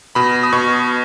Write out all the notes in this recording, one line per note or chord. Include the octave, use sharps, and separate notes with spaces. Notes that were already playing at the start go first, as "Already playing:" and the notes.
B2 B5
D#6
B2 C#6